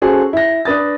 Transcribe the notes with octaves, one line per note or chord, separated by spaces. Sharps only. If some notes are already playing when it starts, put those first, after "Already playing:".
C#4 F#4 G#4 A4 C5
E4 A#6
D4 B4 D#6 A6